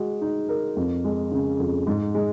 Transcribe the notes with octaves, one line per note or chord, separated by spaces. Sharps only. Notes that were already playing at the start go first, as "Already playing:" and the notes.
Already playing: G#3 F#4
D#4
A#4
F2
G#3
C#3
F2
G#2
G#3